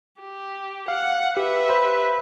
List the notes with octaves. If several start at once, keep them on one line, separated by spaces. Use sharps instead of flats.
G4
F5 F#5
G4 B4 E5
C5 B5